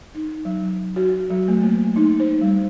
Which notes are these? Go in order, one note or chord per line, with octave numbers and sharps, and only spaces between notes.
D#4
F#3
F#4
F#3
A3
A#3
D#4
C5
G3